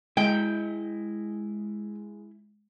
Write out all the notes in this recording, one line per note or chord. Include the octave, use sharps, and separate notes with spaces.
G#3 E4 D#5 G5